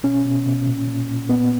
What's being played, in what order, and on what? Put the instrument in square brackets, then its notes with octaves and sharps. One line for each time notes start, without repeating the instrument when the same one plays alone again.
[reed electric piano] B2 C#4
B2
B2
A#2
A#2
A#2
A#2 B3